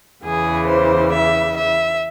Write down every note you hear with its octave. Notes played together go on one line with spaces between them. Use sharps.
E2 C#3 E3 G#4
C5
E5
E5